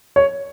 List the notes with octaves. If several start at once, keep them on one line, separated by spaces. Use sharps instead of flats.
C#5